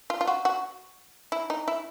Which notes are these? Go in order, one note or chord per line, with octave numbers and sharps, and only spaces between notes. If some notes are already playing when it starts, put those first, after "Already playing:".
F4
F4
F#4
F#4
E4
D#4
E4